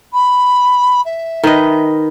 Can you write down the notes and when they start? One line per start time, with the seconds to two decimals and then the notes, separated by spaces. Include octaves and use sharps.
0.13 B5
1.05 E5
1.43 D#3 B4 D#5